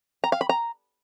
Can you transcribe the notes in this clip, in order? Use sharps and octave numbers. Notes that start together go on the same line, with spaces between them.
A#5
F5
B5
A#5